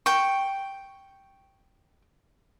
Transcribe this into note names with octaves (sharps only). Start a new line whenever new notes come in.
G5 C#6